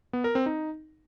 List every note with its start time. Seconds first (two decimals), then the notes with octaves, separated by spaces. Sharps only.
0.13 B3
0.24 A#4
0.35 C4
0.46 D#4